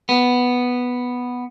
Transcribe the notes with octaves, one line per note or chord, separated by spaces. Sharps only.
B3